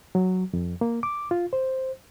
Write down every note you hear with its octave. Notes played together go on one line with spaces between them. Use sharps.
F#3
F2
A#3
D6
F4
C5